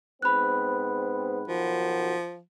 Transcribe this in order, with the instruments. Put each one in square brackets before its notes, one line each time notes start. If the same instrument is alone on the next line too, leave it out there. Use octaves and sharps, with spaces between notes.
[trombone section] G#2 B3 C4 [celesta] B5 F#6
[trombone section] B1 D#3 F#4 [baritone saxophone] F3